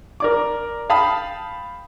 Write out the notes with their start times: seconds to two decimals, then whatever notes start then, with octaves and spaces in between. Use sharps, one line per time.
0.20 A#4 D5 D6
0.90 F5 G5 A5 B5 D#6